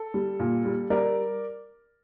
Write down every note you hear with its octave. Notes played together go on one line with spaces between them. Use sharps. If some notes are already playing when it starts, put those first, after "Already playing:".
Already playing: A4
G3
A#2
G3
G3 A#4 D5